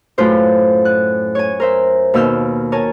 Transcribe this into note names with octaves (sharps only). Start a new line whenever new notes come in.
F#2 A2 F4 B4 C5 G6
F#6
C#5 G#5
A#4 C5 E5
D#2 B2 E6 F6 G6
A#4 C#5 G#5 A5